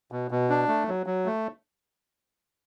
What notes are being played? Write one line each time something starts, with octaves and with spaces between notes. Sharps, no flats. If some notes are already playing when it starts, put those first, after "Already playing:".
B2
B2
D4
A3
F#3
F#3
A3